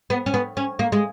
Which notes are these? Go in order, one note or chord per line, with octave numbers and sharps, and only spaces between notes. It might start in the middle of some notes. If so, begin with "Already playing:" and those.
B3
C#4
B3
C#4
A#3
G#3